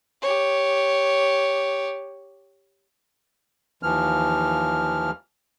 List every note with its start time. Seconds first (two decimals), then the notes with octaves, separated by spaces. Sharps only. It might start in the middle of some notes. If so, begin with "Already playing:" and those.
0.22 G4 C#5
3.83 D#2 E3 F3 F6